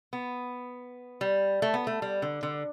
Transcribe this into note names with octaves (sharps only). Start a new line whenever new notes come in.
B3
G3
A3
B3
A3
G3
D3
D3